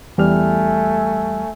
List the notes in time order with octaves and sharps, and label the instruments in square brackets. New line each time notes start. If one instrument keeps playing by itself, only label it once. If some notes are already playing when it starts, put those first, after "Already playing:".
[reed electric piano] E2 G3 F6 [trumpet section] A3 G#5